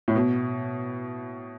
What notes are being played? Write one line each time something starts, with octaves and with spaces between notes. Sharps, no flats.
A2
B2